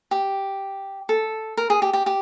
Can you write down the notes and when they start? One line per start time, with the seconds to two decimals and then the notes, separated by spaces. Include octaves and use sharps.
0.11 G4
1.09 A4
1.57 A#4
1.70 G#4
1.82 G4
1.93 G4
2.06 G4